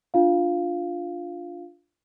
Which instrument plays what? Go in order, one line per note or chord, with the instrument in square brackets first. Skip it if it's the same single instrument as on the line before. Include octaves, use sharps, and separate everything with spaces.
[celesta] D4 F4 F5